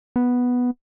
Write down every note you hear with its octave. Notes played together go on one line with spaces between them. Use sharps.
B3